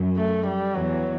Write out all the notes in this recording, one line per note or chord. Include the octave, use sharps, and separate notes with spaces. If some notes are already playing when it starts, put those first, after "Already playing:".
Already playing: F#2 F#3
A3
G3
E2 E3 F#3